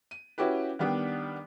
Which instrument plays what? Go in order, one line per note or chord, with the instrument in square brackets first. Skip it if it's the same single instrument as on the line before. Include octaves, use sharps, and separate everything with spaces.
[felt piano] D#7
C#4 E4 F#4 G4 B4
D#3 G3 B3 D4